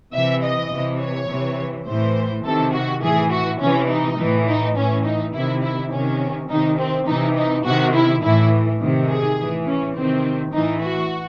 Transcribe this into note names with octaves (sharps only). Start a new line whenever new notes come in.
C3 E3 E5
D#5
C3 E3
C#5
C3 E3
A2 E3 C5
C3 D#3 A4
F#4
A2 E3 G#4
F#4
C3 E3 C#4
D#4
A2 E3
D#4
A2 E3 C#4
D#4
C3 D#3 E4
E4
C3 D#3 C#4
C3 D#3 D#4
C4
C3 E3 D#4
D#4
C3 D#3 F#4
E4
A2 E3 E4
C3 D#3
G#4
A2 E3
C#4
C3 D#3 C4
A2 E3 D#4
F#4